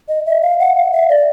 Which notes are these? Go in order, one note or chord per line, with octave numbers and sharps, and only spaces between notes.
D#5
E5
F5
F#5
F5
E5
D5